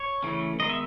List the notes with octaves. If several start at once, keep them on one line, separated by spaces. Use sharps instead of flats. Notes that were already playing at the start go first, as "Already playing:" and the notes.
Already playing: C#5
C#3 E3 A3 C#4
D#3 G#3 B3 D#5
E5